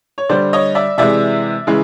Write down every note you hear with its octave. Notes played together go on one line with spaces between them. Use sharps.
C#5
D3 G3 C5 D5
C#5 D#5
D5 E5
C3 E3 G#3 D5 E5
C#3 E3 G#3